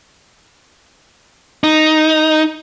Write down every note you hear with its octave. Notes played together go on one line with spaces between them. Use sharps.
D#4